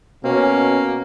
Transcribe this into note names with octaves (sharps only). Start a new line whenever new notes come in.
B2 A#3 C#4